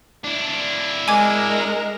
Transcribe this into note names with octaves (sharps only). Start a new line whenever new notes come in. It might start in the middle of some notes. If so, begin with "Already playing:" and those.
D4 E4
G#3 A#4 D#5 G#5 D6 G#6